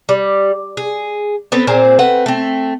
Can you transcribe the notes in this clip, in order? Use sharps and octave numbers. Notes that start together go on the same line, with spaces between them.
G3
G#4
B3 C4 A4 B4
A#2 C4 G#4 C5
A3 C4 B4 F#5
A3 C4